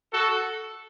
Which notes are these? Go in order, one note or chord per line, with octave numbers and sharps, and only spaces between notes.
F#4 A4